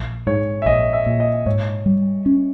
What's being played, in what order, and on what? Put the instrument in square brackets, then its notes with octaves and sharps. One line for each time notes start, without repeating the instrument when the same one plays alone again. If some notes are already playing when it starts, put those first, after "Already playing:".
Already playing: [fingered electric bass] A#1
[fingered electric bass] G#2 [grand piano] C#5
[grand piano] E5
[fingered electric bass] A#1 [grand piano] D#5
[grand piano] E5
[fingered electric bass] A#2
[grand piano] D#5
[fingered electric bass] G#2 [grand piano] C#5
[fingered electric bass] G3
C#4